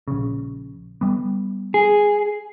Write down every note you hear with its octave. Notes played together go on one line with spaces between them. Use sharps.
A#1 C#3
G3 B3
G#4